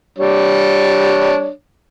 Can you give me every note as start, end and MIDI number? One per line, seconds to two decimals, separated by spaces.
0.18 1.50 55
0.18 1.50 62
0.18 1.50 73